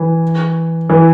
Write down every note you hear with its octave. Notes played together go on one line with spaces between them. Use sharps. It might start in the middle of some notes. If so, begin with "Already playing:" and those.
Already playing: E3
E3